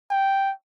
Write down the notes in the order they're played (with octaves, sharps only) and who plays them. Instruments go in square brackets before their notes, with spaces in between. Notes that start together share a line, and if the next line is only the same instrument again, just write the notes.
[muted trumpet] G5